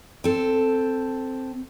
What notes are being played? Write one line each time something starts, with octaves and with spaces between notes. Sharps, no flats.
C4 A4